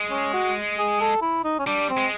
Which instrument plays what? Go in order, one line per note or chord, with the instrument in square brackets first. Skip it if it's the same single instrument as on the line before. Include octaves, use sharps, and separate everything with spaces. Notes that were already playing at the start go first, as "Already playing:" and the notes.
Already playing: [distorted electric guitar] G#3
[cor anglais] C#4
F#4
G#4
A4
E4
D#4
C#4
[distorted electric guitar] G3 [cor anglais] D4
[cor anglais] C4
[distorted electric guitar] G#3